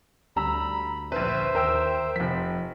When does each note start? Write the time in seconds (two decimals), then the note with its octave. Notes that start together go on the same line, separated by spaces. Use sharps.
0.36 D2 G3 A#5 B5 E6
1.12 A#1 B4 C5 E5
1.55 D#2 A#4 G5 E6
2.16 F1 F3 B6